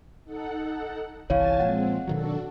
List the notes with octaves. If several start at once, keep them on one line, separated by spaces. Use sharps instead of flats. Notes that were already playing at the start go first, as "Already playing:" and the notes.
D#4 A4 F#5
G1 C2 E3 C#5 F5 G#5 A5 A6
A#2 F3 G#3 C4 F#5
B2 D#3 F#3 D4 F#4 A4